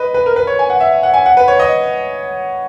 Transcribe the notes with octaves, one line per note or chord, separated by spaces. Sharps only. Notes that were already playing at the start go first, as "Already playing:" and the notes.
Already playing: B4 D#5
B4
A#4
B4
C#5
G#5
F#5
E5
F#5
G#5
F#5
B4
C#5
D#5